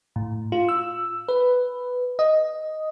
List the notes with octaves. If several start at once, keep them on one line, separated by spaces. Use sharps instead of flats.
A2
F4
E6
B4
D#5